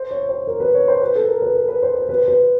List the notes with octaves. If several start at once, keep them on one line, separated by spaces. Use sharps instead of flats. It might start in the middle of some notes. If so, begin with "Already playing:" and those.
Already playing: C5
C#5
C5
A#4
B4
C#5
C5
B4
A4
A#4
B4
A#4
B4
C5
C5
B4
C5
B4